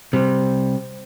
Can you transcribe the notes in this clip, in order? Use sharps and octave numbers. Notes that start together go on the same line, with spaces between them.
C3 G3